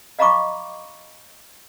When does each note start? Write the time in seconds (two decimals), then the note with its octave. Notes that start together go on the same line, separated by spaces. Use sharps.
0.19 D#5 F5 A#5 B5 C#6 D6